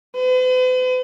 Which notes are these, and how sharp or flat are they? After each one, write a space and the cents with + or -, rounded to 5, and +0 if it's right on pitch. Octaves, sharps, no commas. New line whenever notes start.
B4 +45